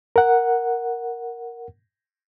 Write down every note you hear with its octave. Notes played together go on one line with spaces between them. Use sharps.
A#4 F#5